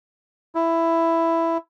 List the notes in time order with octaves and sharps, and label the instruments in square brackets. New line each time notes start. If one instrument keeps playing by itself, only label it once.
[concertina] E4